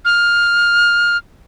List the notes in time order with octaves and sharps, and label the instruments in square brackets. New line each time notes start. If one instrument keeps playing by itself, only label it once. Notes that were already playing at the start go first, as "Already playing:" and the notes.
[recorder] F6